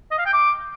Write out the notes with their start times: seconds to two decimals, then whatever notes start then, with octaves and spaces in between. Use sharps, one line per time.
0.11 D#5
0.18 F5
0.26 G5
0.33 D6